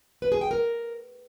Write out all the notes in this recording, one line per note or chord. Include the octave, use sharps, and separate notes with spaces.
B4
G#4
G5
A#4